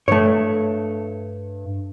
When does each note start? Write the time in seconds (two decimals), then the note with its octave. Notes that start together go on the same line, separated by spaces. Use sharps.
0.08 G2 A3 C#5